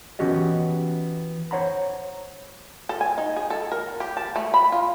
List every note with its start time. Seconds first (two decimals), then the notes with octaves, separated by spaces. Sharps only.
0.19 E3 B3 C#4 F#4 G4 D#5
1.51 C5 C#5 F#5 A#5 B5
2.89 A4
3.01 G#5
3.18 D#4
3.36 G#4
3.50 A4
3.72 A#4
4.00 G4
4.17 A5
4.36 A3
4.54 B5
4.72 F4